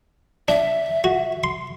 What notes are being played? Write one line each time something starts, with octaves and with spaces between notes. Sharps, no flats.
D4 E5
F#4
C6